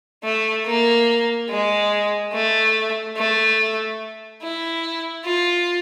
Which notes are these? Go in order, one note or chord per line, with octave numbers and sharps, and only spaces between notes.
A3
A#3
G#3
A3
A3
E4
F4